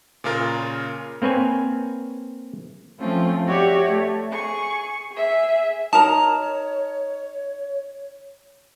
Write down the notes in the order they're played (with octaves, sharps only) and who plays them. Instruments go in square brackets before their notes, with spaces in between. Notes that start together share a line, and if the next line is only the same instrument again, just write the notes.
[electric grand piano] A#2 C#3 F4 A#4
[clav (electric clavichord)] A#3 C4 B4 C#5 G#5
[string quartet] F3 A3 C4 C#4 F4
F#4 G4 C#5 D5 E5
A3
G#4 C#6
G#4 E5
[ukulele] D#4 A#4 A#5 [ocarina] C#5 [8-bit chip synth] A5